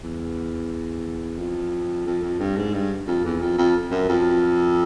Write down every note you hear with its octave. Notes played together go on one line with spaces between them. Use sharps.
E2
F2
F2
F2
G2
G#2
G2
F2
E2
F2
F2
F#2
F2